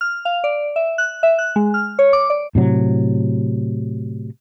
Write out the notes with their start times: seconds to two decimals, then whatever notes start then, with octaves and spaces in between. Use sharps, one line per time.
0.01 F6
0.25 F5
0.44 D5
0.76 E5
0.98 F#6
1.23 E5
1.39 F#6
1.56 G#3
1.74 F6
1.99 C#5
2.13 D6
2.30 D5
2.55 A2 C3 F#3